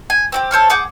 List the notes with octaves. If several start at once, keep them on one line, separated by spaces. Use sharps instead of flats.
G#5
C4 F#4 G4
A4 C5 C#5 F6
G#4 F#5 D6 G6